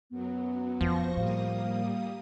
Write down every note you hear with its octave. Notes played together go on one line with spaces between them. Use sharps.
F#2 F#3 B3
D#1 F2 F3 C5 C#6 A#6
A2 G3 A#3 F5 D#6